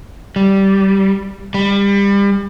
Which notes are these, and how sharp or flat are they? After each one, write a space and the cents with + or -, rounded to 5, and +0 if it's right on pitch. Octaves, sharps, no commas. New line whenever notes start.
G3 -10
G3 +30